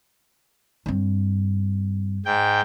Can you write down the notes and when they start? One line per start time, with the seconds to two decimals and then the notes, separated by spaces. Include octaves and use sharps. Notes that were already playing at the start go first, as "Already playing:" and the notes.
0.86 G2 C4
2.26 G#2 G5